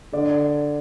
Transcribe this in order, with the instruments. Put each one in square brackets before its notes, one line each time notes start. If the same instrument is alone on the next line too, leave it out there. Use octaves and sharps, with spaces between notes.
[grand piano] D3 D5